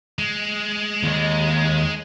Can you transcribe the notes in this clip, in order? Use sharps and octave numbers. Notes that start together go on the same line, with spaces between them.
G#3
D#2 D#5